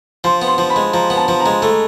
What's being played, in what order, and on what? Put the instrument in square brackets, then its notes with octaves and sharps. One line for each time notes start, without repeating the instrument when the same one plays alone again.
[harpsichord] F3 [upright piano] C6
[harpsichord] B3
[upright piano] C6
[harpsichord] F3
[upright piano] B5
[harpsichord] G#3
[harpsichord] F3 [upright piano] A#5
[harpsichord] B3
[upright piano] A5
[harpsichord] F3
[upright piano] A#5
[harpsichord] G#3
A3